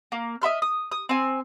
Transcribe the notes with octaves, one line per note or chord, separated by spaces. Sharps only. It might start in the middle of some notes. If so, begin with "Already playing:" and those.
A#3
D#5 E5 C6 F6
D#6
D#6
C4 G#5